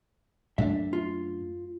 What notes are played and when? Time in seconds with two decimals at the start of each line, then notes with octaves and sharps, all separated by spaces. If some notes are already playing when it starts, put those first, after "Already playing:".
0.58 F#2 A3 D4 E5
0.93 F4